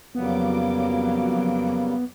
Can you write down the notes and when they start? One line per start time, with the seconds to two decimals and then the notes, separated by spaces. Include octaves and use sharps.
0.15 F2 C#3 F#3 G3 A#3 B3 D6